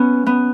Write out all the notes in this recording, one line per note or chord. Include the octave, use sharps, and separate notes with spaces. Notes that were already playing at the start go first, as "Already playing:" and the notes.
Already playing: B3 C#4
B3